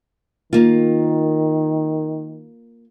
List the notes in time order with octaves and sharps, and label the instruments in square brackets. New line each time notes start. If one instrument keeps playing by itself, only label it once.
[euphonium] D#3 [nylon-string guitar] A#3 F4